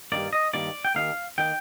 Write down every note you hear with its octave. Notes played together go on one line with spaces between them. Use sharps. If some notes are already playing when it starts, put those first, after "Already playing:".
G2 D#3 A#3 D5
D#5
G2 D#3 A#3 D5
G5
D#2 D#3 A#3 F5
D#3 A#3 G5